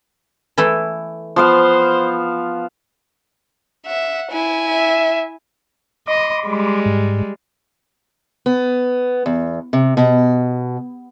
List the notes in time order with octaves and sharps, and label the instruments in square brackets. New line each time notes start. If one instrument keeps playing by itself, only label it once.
[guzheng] E3 A3 E4
[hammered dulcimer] F3 B3 F5 [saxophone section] C5
[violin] E5 F#5
E4 G#5
[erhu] E5
[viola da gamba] D#5 [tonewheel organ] B5 C6 D6
[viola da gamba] G3 G#3
[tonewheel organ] G#2
[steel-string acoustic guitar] B3
E2
C3
B2